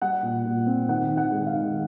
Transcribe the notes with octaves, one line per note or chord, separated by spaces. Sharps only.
G3 F#5
A#2
A#2
C4
D#3 F#5
D#3
F#5
G#3
F5
D#3